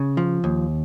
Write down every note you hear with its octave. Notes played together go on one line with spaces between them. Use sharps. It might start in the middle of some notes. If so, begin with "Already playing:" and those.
Already playing: C#3
F3
D#2